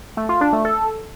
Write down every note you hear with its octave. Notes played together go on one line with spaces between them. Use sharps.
A3
F4
D4
A3
A4